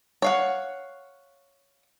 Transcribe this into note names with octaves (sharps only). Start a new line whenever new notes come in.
C#5 F5 F#5